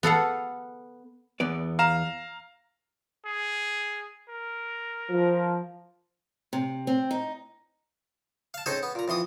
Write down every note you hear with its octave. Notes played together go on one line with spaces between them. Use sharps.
B3 A4 F5 F#5
E2 B3 D5
F5 A#5 E7
G#4
A#4
F3
C3
C4
D#4
F5 A5
C4 C#4 D#4 G#4 A4 C5
B3
A#2 A#5
F2 E3 C6 D#6